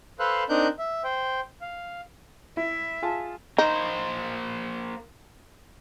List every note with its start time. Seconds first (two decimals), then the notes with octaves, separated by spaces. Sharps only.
0.19 A4 B4 C5 F5 E6 F#6
0.49 C4 D4 D#4 A#4 F#6 G6
0.79 E5
1.04 C5 G5
1.61 F5
2.57 E4 E5
3.02 F4 G#4 A5
3.58 A#3 D#4 C5